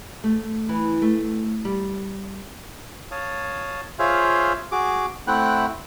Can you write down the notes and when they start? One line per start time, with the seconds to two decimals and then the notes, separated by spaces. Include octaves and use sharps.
0.24 A3
0.69 E3
1.02 A3
1.65 G3
3.11 C#5 F5 A5 D#6
3.99 F4 G#4 C5 C#5 E5 F5
4.72 F#4 G#4 D6
5.27 A3 C4 E4 F#5 G5 F#6